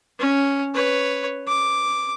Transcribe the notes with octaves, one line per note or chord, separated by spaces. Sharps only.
C#4
B4 C#5
D6